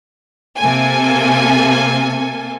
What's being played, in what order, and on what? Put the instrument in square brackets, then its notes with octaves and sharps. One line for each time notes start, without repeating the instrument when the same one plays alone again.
[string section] C3 A#3 A4 G#5